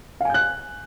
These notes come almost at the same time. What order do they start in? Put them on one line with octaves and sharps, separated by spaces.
F5 G#5 G6 F#6